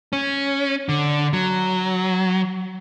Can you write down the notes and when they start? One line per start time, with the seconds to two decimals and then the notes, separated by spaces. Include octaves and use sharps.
0.13 C#4
0.89 D3
1.33 F#3